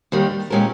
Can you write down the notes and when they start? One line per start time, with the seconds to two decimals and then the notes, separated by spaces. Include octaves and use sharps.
0.12 D#2 D#3 G3
0.50 A#2 G#3 C#4 G4 A#4